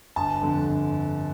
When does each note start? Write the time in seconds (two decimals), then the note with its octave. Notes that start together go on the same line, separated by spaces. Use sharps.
0.16 G1 A5
0.42 F2 D3
0.66 G1